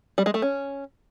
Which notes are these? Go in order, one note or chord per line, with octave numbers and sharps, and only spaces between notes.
G3
G#3
A3
C#4